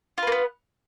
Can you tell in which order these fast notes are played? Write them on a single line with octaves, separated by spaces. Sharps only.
F4 B4 A#3 B3